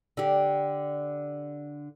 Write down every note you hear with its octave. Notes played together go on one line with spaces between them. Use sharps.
D3 G4